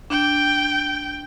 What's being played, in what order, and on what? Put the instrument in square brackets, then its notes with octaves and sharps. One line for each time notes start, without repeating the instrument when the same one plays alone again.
[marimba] D4 [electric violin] G5